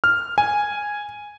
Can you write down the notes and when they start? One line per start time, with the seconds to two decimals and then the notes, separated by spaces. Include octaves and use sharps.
0.04 F6
0.38 G#5